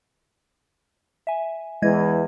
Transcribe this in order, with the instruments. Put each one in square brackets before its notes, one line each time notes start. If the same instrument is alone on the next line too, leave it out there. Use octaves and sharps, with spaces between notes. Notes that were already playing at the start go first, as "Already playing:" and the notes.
[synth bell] E5 G#5
[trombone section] E2 E3 [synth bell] G#3 D#5 G#6